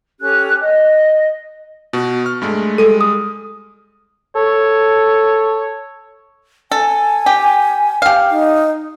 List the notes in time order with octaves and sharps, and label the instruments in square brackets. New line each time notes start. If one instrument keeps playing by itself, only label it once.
[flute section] C#4 G4 A4 F#6
D#5
[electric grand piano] B2 F#4
C#6 F6
G2 G#3 A3
[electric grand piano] G3 G#3 D#7 [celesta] A4
[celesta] D#6
[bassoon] A4 [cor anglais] C#5
[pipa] A4 [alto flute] G#5
[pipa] G4
G4 F5
[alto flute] D#4